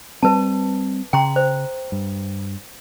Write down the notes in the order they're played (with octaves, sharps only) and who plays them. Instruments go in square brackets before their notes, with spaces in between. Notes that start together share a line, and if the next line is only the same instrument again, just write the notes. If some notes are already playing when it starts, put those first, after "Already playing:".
[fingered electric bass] G3 C4 [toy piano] B4 A5
[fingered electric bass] C#3 [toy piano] G5 A#5 C6
[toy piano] C5
[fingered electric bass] G2